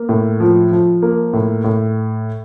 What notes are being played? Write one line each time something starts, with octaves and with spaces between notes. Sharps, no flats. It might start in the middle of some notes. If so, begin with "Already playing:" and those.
Already playing: A#3
A2
F3
F3
A#3
A2
A2